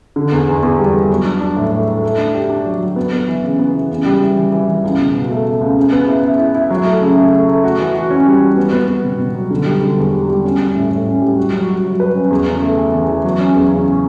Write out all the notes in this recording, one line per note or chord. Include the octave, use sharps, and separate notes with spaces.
D3
E2
E2
E2
G3
E2
F#3
D4
D4
A2
A3
A3
A3
D4
G4
D4
F#3
F#3
B3
B3
E3
C#3
B3
E3
C#3
G3
E3
E3
E3
E3
C#2
B2
B2
A3
A3
C#2
C#3
B3
E4
E4
E4
E4
F#3
A3
C#3
A3
A3
A3
F#4
E3
F#4
C#4
G3
F#4
B3
B3
B3
B2
B2
F#3
D3
G3
D3
E2
G3
G3
C#4
C#4
A2
A2
C#4
G3
F#4
F#3
F#4
F#3
B4
C#4
E2
C#3
A3
E3
E2
E3
F#3
C#4
E2
C#3